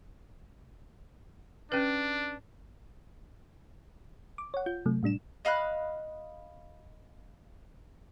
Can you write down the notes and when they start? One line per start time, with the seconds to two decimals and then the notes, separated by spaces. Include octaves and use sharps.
1.72 C#4 D4 B4
4.38 D6
4.54 C#5 F#5
4.66 F4 G6
4.86 C3 F#3 A3
5.03 A2 G3 D4 E7
5.45 D#5 F5 B5 F#6